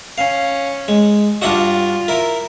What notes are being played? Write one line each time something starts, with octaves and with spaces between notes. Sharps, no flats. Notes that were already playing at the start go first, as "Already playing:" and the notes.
C#4 F5
G#3
G2 D4 F4 F#4
E4 A#4